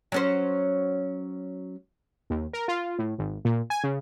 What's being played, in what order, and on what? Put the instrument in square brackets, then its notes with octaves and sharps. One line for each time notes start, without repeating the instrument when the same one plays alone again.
[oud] F#3 C#4 C5
[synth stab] D#2
A#4
F4
A2
G#1
A#2
G#5
C#3